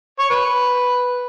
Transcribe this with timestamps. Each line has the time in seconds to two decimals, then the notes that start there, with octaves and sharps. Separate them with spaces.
0.19 C#5
0.30 B4